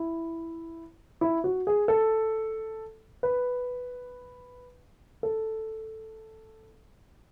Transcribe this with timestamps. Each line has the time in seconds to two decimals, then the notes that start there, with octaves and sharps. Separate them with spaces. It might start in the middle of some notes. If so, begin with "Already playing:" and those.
Already playing: E4
1.21 E4
1.44 F#4
1.67 G#4
1.88 A4
3.23 B4
5.23 A4